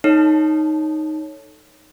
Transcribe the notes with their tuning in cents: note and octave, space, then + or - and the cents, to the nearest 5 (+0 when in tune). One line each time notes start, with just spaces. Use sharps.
D#4 +0 A4 +5 C#5 +0